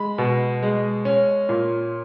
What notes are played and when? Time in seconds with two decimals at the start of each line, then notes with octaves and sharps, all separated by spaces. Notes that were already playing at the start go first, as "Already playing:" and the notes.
Already playing: G#3 B5
0.18 B2
0.63 G#3
1.05 C#4
1.49 A#2